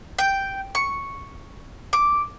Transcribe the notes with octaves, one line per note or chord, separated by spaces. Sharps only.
G5
C#6
D6